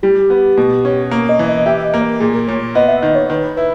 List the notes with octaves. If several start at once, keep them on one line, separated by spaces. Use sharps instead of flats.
G3 G4
B3
B2
C#4
A#3 A#4
D#5
E3
D#5
G4 E5
D#5
A#3
A#4
A#2 G#4
A#4
A#2 C#5
B3 D#5
E5
D#3 D#5
C#5
D#3 B4
E4 B4